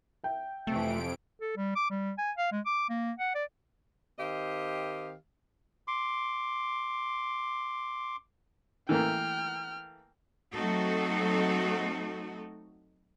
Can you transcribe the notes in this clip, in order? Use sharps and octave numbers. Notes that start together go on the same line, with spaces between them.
E5 G5
F2 C3 E3 A3 D7
A4
G3
D6
G3
G#5
F5
G#3
D6
A#3
F#5
D5
D#3 C4 G4 D#5 F5
C6 D6
E3 A3 A#3 G5 F6
F#3 A3 C4 D#4 F#4 A4